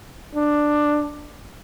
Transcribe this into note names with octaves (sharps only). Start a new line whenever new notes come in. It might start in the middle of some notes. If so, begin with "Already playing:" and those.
D4